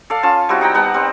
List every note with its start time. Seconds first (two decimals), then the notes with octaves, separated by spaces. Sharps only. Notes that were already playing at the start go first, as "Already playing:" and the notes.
0.10 A4 D5 F5
0.23 C#4 F4 A5
0.49 G3 C4 E4 F#4
0.61 D#4 F#5 G5 A#5
0.74 G3 B3 F#5 A5
0.94 G3 C4